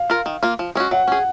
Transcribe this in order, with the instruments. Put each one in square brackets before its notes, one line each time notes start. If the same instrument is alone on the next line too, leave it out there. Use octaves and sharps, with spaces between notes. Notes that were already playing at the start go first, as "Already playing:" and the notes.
Already playing: [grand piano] F5
[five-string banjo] F4 A#4
D#3
A#3 F4
F3
G#3 C#4 F#4
[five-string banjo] F#3 [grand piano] F#5
[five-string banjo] C#4 G#4